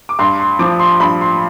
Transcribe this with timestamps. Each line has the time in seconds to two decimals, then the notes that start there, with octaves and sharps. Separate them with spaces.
0.09 D6
0.19 G2 C6
0.40 C6
0.59 F3 D6
0.79 C6
1.00 G2 B5
1.21 C6